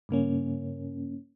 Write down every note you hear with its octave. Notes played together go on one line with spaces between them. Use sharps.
G2 C#3 A#3 C#4